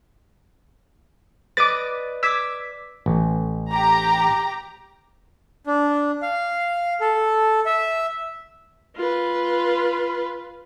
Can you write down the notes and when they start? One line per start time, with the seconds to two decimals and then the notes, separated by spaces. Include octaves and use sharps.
1.57 B4 D5 D#5 D6 A6
2.23 D6 E6 G#6 B6
3.06 A1
3.72 G4 A#5
5.66 D4
6.22 F5
7.01 A4
7.66 E5
8.96 F4 B4